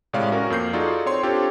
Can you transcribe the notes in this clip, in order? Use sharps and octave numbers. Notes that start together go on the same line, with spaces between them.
A2 C3 G#3 C#5 D5 F5
C#4 F#4 A#4
F2 A#3 G6 C7
D#4 F4 F#4 G#4 A4 D5
C4 C#5 C6
C4 D4 F4 G4 A4 C#5